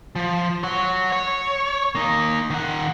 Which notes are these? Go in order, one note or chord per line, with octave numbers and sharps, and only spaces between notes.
F3
C#5 F#5
C#5
A#3 D#4
D#3 F#5